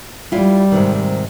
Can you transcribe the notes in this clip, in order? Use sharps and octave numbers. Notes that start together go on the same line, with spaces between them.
G3 E4 F4
G#2 C3 D#3